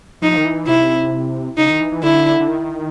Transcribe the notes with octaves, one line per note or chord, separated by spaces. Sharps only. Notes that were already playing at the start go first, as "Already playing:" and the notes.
F3 D#4
D#3
E3
C3 E4
C#3 D#4
D#3
E3
E3
D3 E4
D3
D#3